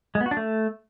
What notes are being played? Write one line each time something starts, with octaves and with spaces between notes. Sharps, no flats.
G#3
B3
F#4
D4
A3